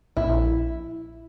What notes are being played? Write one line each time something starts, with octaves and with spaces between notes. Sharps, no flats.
A#1 E4